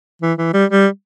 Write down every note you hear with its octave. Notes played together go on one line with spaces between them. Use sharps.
E3
E3
G3
G3